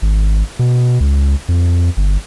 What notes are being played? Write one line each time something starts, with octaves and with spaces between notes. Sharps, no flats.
G#1
B2
C#2
F2
G1